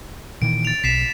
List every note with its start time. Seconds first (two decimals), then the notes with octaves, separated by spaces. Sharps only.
0.42 A#2 D#3 E3 D7
0.65 A6 F7
0.84 B1 B6 C7 E7